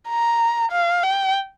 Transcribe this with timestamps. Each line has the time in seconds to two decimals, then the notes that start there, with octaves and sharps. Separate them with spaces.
0.08 A#5
0.72 F5
1.03 G5